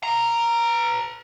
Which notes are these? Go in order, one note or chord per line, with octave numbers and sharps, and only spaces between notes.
B4 A#5